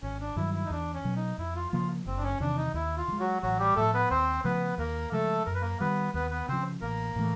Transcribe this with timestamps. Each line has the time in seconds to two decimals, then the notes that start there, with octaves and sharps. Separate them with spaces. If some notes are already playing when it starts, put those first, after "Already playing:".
0.02 G#1 C#4
0.21 D4
0.36 G2 D#3 F#3 E4
0.54 E4
0.66 D#4
0.70 E2 D4
0.94 C#4
1.05 B2 F#3
1.16 D#4
1.38 F2 E4
1.56 F4
1.73 C#3 F3 A#3 F4
2.06 F#1 C4
2.18 D4
2.23 C#4
2.40 E2 C3 D#3 D4
2.57 D#4
2.74 D#2 E4
2.97 F4
3.08 D#3
3.12 G#3
3.20 F#3 F#4
3.42 A1 F#3 F#4
3.59 G3 G4
3.76 A2 F3 A3 A4
3.94 B3 B4
4.10 D#2 C4 C5
4.44 C#3 F3 A3 B3 B4
4.78 D#2 A#3 A#4
5.12 C#3 F3 G#3 A3 A4
5.46 F#2 A#4
5.54 B4
5.61 A#3 A#4
5.80 D#3 G3 B3 B4
6.14 D#2 B3 B4
6.31 B3 B4
6.48 C#3 F3 C4 C5
6.81 A1 A#3 A#4
7.16 A2 E3 A3